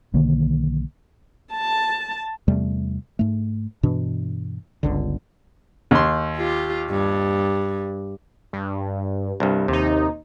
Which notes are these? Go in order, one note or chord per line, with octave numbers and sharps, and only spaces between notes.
B1 D3 D#3 A#3
A5
E2 C3 G3 A3
G#2 A3
G2 B2 E3 D4
G1 C#2 D3
D#2 C6
F4 G4
G2
G2
C2 G2
D#2 C3 D#4